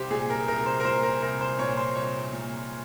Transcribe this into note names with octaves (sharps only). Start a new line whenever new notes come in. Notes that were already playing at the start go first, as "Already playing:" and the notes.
Already playing: C2 G4 C5
A#2 G#4
A#4
C2 A#4
C5
A#4
A#2 C5
A#4
C2 A#4
C5
A#2 C#5
C5
C2 C#5
A#2